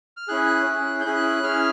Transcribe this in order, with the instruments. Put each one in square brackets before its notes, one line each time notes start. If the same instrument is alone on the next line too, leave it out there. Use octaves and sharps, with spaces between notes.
[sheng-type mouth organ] F6
C#4 E4 G#4 F#6
C#4 E4 G#4
G6
C#4 E4 G#4 F#6
C#4 E4 G#4 F6